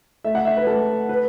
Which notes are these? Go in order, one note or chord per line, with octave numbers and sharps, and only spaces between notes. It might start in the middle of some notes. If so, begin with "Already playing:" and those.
A3 E5
F#5
E5
B4
A3 A4
B4